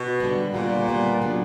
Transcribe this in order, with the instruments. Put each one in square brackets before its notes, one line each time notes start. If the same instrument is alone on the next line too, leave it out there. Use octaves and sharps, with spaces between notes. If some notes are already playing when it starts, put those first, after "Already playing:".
Already playing: [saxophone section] B2
[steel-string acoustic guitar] D3 G3 B3
[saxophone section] A#2 [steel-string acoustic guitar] D3 G3 B3
[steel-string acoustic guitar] D3 G3 B3
C#3 F#3 B3 D4